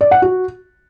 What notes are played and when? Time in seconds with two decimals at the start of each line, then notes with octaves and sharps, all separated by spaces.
0.01 D5
0.11 F#5
0.22 F#4